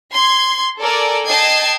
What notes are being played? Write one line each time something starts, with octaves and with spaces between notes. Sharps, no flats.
C6 G#6
A4 A#4 D5 G#5
D#5 G5 A5 G#6 C7